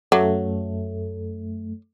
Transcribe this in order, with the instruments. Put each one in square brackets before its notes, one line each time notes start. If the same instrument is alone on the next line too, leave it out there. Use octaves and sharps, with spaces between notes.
[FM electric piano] F#2 A3 [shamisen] F#3